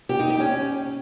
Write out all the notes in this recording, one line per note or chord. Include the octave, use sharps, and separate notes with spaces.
G4
D#4
G4
C#4